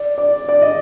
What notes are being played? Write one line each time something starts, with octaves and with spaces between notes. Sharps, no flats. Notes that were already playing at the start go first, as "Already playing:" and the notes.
Already playing: D5
D5
D5
D#5